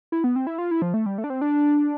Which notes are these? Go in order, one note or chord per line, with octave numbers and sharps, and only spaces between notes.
E4
B3
C4
E4
F4
E4
F3
A3
G3
A3
D4
C4
D4